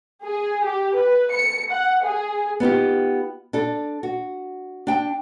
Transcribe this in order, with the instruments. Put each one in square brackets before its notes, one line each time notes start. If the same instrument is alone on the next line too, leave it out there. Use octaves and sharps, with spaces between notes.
[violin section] G#4
G4
B4
C#7
F#5
G#4
[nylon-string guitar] B3 D#4 F4 G4
D4 A4
F#4
D4 G5 A5